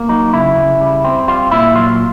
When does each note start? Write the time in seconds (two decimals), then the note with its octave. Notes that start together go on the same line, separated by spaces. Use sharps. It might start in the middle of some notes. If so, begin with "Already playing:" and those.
Already playing: A#3
0.09 F#3 D#4
0.33 C#3 E4
0.57 C#3
0.81 G3
1.04 C4
1.28 G3 F4
1.51 A#2 E4
1.75 F#3 F4